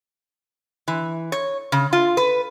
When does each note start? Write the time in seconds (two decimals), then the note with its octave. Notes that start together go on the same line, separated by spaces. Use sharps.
0.88 E3
1.32 C#5
1.72 C#3
1.93 F4
2.17 B4